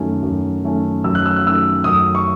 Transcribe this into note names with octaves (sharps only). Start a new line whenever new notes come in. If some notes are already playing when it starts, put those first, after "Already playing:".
Already playing: F#2 D#3 F#3 A3 C#4
F#2
D#3 F#3 A3 C#4
F#2 E6
F#6
E6
F#6
D#3 F#3 A3 C#4 E6
F#2 D#6
C#6